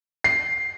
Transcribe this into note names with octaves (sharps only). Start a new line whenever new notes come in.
C7